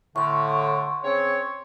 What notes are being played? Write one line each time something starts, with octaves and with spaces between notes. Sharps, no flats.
A2 D3 C6 C#6
C#3 C4 C#5